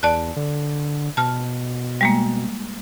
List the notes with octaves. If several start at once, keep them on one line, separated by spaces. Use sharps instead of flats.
E2 D5 A5 F#6
D3
B2 A5 F6
G3 G#3 A#3